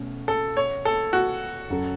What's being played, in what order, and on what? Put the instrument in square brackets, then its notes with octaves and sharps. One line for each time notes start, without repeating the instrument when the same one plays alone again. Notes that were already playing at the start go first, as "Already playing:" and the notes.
Already playing: [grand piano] B2 A3 C#4
[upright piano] A4
C#5
A4
F#4
[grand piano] F#2 F#3 C#4 A4